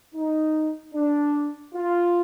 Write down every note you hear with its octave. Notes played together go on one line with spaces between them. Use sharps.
D#4
D4
F4